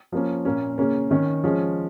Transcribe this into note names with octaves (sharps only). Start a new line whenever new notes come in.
F3 A#3 C#4
A#2 A#3 C#4
C#3 A#3 C#4
D#3 C#4
F3 G#3 C#4